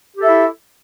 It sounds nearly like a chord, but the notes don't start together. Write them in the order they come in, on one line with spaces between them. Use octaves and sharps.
G4 A4 E5 E4